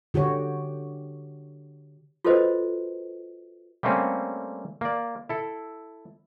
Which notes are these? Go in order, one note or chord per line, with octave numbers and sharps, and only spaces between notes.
D3 F#4 G4 C#5
F4 F#4 A4 B4 C5 D#5
G3 A3 A#3 C4 C#4
A#3 D5
E4 A4